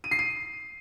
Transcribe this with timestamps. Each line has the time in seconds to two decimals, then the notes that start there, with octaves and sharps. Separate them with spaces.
0.04 D#7
0.11 C7
0.19 D#7